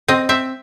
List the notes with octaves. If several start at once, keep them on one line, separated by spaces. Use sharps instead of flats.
C4 D#5
C4 E5